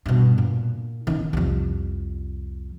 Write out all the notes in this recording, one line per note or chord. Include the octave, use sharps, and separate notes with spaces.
G2 B2
A#2
D#3 C#4
C2 F2